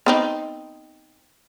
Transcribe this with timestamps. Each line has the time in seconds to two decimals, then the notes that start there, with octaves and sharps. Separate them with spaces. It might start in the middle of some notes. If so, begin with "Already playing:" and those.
0.06 B3 C4 D#4